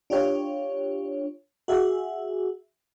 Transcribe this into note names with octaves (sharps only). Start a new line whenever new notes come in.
D4 F4 G4 C#5
F#4 G#4 E5